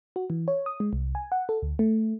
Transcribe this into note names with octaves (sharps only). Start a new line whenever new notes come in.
F#4
E3
C#5
D#6
G#3
C2
G#5
F#5
A4
D2
A3